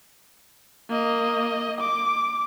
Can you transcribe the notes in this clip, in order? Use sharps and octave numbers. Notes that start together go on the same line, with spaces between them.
A#3 D#5
D6